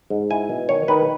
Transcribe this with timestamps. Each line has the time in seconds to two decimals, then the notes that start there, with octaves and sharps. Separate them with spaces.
0.10 G#2
0.30 E4 G#5
0.49 B2
0.69 D#3 C#5
0.88 D#3 B4